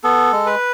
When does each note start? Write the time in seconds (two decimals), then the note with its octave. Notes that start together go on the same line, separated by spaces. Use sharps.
0.03 B3 A4
0.32 G#3
0.46 B4